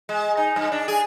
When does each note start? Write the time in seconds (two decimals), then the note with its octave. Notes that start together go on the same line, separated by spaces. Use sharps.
0.09 G#3
0.37 D#4
0.56 G2
0.72 D4
0.88 G#4